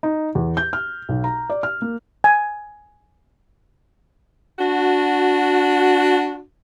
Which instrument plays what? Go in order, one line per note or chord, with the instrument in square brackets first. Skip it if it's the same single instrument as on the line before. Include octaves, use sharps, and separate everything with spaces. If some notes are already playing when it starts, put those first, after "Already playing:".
[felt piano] D#4
E2
G6
F6
B1
A#5
D5
F6
A#3
[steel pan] G#5
[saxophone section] D4 F#4